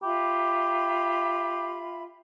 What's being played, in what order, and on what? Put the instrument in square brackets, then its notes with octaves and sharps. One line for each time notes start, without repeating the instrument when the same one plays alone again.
[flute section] F4 E5 B5 [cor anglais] G4